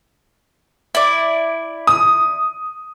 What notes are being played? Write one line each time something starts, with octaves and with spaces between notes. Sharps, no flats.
E4 D5
D#6